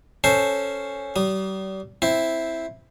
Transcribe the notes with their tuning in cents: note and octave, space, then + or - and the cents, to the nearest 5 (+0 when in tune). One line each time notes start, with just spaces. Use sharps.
C#4 +0 A4 +0 C5 +0
G3 -40 D#6 -10
C4 +0 E4 +0